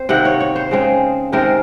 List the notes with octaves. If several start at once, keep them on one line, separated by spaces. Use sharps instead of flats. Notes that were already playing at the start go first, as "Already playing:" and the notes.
Already playing: C4 C5
C3 D#3 A#3 F#5
C#5
C#5
C5
C#3 G#3 C4
C3 D#3 G#3 C4 A#4